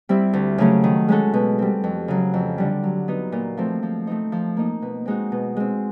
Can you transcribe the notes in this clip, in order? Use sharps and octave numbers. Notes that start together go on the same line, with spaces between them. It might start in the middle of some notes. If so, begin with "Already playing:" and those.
G3 C4 E4
D2
C#3 F#3 A3 C#4
D#3
G#3 C#4 F#4 A4
B2
G3 C4
F2
C#3 F#3
F2
D3 G3
F#3
B3 D#4 F#4
A#2
F3 A3 C4
F3
A3 C4 D#4
F3
A#3 D#4
B2
G#3 C4 D#4 F#4
B2
G#3 C4